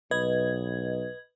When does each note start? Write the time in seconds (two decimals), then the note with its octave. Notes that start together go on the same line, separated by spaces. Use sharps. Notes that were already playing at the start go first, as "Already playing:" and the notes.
0.11 B1 B4 D#5 G#6